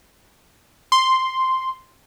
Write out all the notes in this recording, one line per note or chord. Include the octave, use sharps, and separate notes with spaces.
C6